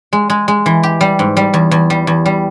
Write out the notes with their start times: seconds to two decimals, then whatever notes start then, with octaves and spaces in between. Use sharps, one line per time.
0.13 G#3
0.30 G#3
0.48 G#3
0.66 E3
0.83 G4
1.01 G3
1.19 G#2
1.37 G3
1.54 E2
1.71 E2
1.90 G3
2.07 E2
2.26 G3